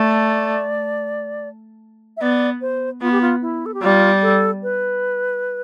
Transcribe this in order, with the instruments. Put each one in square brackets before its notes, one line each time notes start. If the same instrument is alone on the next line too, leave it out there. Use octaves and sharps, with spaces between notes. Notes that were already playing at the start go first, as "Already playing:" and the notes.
Already playing: [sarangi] A3 [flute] D5
[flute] E5
[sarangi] B3 [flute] D5
[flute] C5
[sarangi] B3 [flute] F4
[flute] G4
F4
E4
A4
G4
[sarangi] G3 [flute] F4
[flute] A4
B4